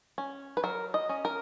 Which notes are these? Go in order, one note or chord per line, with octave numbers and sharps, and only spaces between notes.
C#4
B4
F#3 A#4
D#5
C#4
A#4